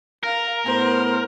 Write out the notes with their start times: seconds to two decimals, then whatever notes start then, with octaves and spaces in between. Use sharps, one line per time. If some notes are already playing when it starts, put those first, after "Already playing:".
0.23 A#4 F5 A#5
0.66 A2 B3 C5